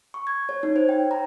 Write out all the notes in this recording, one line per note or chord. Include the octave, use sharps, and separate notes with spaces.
C#6
G#6
C#5
D#4
C5
G5
A#5